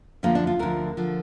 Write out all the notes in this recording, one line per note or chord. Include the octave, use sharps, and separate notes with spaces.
D2 D3 F3 A#3
D4
F4
D2 D3 F3 A#4
D3 F3